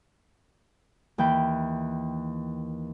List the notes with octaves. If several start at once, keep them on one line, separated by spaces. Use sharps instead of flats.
D#2 E3 G5 B5